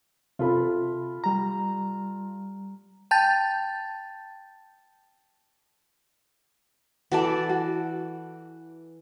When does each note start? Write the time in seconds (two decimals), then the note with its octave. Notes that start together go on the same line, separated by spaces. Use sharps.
0.39 C3 F4 A4 B5
1.24 G3 A#5
3.11 G5 A5 G6 A6
7.12 E3 F#4 A4 D5 A5
7.49 F#4